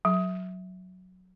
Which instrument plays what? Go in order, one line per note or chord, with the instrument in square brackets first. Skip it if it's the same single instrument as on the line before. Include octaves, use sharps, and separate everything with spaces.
[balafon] F#3